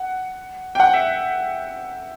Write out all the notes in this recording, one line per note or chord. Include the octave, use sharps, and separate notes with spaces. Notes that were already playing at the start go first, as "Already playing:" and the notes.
Already playing: F#5
G5
F#5
E5